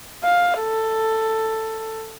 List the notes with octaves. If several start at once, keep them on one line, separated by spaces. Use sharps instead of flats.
F5
A4